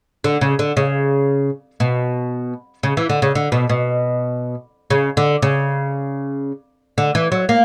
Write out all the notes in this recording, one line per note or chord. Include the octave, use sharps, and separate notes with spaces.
D3
C#3
D3
C#3
B2
C#3
E3
D3
C#3
D3
B2
B2
C#3
D3
C#3
D3
E3
F#3
A#3